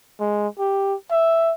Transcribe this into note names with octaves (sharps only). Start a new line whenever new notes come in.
G#3
G4
E5